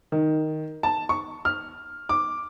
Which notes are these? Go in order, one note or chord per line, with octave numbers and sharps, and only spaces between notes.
D#3
A5
C#6
F6
D6